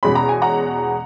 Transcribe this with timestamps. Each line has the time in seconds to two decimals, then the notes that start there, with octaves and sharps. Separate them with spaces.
0.03 E2 B2 G#3 C#4 B5
0.15 A#5
0.29 G#5
0.42 F#5 A#5